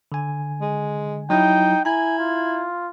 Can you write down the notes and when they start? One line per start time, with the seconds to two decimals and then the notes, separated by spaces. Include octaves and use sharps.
0.12 D3 G#5
0.61 G#3
1.30 F#3 D#4 E4 G5
1.85 E4 G#5 A#5 G#6
2.18 F4